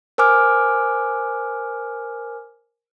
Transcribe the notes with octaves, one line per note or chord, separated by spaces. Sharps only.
A#4 C5 G#5 D6 F6